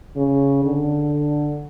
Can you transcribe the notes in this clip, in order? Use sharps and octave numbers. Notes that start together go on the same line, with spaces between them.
C#3
D3